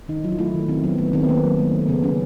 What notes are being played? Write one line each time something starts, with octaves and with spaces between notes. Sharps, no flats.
D#3 D#4
F#3 E4
F4
A3 E4
D#3
D#3 C4
F#3 B3
A3 B3
D#3 C4
B3
D#3 A#3
F#3
A3
D#3
C#3 B3
F#3 C#4